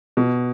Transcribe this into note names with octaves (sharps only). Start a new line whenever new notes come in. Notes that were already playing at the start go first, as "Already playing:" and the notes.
B2